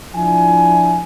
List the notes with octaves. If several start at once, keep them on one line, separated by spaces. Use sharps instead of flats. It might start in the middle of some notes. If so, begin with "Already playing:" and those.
F3 D4 E4 G#5